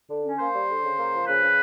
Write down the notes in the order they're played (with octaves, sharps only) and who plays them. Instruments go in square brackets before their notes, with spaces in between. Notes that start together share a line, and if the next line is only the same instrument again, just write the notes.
[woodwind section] D3
C#4
A#3 C5
G3
D3
C#3
A#3
F3
C#3 B4
C#3